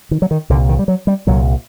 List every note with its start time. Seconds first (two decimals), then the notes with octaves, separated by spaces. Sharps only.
0.11 D#3
0.22 F#3
0.31 D#3
0.49 C2 D3
0.54 A#2
0.69 D#3
0.79 G3
0.88 F#3
1.07 G3
1.27 C2 A#2 F#3